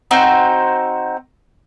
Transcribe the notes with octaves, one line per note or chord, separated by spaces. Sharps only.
C4 D#4 F#4 C5